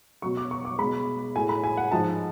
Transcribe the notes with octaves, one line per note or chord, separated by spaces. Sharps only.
B2 F#3 C#6
D6
C#6
D6
B2 G#3 B5
A2 G#3 G#5
B5
G#5
F#5
G#2 F3 G#3 A5